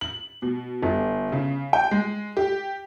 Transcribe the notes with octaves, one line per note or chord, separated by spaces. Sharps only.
F#7
B2
G1
C#3
G5
G#3
G4